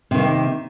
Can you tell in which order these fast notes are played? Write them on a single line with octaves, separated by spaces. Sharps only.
C3 D#3 A#3